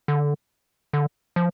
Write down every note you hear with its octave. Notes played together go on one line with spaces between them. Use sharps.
D3
D3
F3